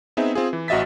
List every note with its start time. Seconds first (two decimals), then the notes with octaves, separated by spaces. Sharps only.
0.17 B3 C4 D#4 G#4 E5
0.35 C4 F4 G#4
0.53 E3
0.68 A1 F#4 D#5 E5 A6 B6